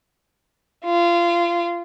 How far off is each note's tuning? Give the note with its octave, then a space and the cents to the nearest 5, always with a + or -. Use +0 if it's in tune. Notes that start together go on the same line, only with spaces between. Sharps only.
F4 -25